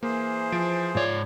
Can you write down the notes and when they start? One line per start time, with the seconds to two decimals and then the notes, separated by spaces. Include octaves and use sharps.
0.03 E3 A#3 G#4 C5
0.52 F3 D7
0.95 G#2 F4 C#5 D5